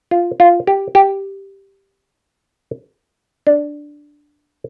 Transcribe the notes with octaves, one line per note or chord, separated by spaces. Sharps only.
F4
F4
G4
G4
D4